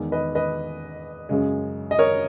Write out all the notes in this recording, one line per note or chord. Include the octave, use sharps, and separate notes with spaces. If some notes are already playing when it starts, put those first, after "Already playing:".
Already playing: E2 D#3 G#3
B4 D#5
B4 D#5
F#2 C#3 G#3
D#5
A#4 C#5